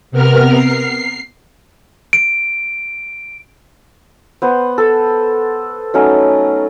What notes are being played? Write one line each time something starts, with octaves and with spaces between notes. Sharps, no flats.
C3 B3 A#4 F6
C7
D7
B3 C5
A4
F#3 A3 C#4 D#4